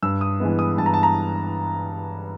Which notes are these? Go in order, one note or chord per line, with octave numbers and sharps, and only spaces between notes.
G2 E6
D#6
E3 G#3 B3
D#6
G2 A5
A#5
A5
A#5